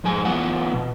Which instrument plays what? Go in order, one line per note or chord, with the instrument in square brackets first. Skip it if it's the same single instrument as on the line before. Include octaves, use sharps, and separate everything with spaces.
[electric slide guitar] F2 G#2 G#3 G#5
E3 B3 F4 F#5
B2